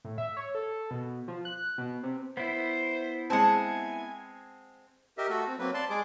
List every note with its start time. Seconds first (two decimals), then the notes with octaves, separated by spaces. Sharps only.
0.05 A2
0.18 E5
0.37 C#5
0.55 A4
0.91 B2
1.28 F3
1.45 F#6
1.78 B2
2.03 C3
2.37 B3 E4 C5
3.30 G#3 C4 F#5 G#5 A5
5.18 G4 A#4 D#5 E5
5.29 A3 F#4 A4
5.47 C4
5.59 F#3 A#3 C4 B4
5.74 D5 A5 C6
5.90 G#3 G#4 D6